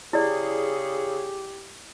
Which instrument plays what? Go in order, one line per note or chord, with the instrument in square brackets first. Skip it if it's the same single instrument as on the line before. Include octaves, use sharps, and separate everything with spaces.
[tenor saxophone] C#3 [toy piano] E4 D5 [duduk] G4 [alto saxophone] G#4